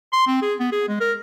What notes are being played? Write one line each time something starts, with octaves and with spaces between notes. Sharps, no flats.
C6
C4
G#4
B3
G#4
G#3
A#4